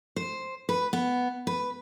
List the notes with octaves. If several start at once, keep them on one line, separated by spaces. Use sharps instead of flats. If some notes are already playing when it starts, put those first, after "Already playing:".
C5
B4
B3
B4